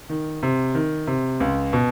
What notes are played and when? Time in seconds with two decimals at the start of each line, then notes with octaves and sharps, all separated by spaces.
0.09 D#3
0.43 C3
0.75 D#3
1.07 C3
1.40 C#2
1.73 B2